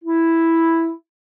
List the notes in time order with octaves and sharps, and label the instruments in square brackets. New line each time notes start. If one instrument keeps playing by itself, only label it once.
[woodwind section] E4